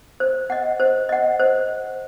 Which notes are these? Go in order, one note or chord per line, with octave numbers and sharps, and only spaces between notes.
C5
D#5 F#5
C5
D#5 F#5
C5